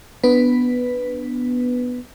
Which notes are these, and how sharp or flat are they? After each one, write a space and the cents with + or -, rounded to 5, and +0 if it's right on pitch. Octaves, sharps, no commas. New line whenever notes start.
B3 +0 D4 +0 B4 +0